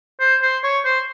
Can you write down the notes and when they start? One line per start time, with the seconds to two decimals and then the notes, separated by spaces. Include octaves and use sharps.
0.20 C5
0.42 C5
0.64 C#5
0.85 C5